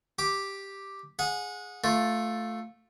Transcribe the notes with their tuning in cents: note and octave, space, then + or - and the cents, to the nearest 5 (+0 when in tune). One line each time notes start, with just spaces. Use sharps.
G4 +0 D6 +0
G#4 +0 F#5 -30
A3 +0 F4 +10